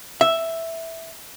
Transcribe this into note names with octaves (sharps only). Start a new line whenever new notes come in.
E5